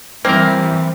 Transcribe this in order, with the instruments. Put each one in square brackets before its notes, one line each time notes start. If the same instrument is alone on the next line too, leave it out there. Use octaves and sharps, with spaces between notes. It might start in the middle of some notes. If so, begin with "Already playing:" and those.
[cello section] E3 G3 [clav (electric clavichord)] A#3 A#4 [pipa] C4